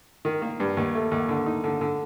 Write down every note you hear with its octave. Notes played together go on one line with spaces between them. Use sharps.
D#3
A#3
G2
D#2
A3
D#2
D3
D#4
D3
D3